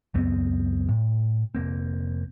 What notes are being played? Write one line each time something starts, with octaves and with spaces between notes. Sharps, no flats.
C#2 F#2 B3 C4
A2
F1 A#3 C4